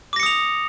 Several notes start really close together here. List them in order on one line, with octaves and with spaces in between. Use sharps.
D6 A#6 C#7 D#6 F7